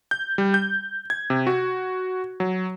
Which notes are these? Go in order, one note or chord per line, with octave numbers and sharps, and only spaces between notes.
G6
G3
G6
G#6
C3
F#4
F#3